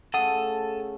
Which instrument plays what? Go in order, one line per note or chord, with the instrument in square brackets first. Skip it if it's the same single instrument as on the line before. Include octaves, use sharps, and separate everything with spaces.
[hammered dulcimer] C#3 A3 [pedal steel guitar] A4 D#6 [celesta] F#5